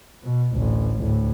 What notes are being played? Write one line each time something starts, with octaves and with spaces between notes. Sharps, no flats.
B2
A1 D2
D2 A2